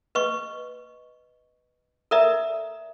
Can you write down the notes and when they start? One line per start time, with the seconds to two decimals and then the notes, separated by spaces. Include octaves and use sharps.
0.15 B4 D#5 C#6
2.11 A4 A#4 D5 E5 A#5